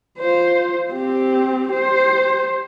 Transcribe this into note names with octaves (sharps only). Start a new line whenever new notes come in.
F4 C5
C4 G4
G4 C5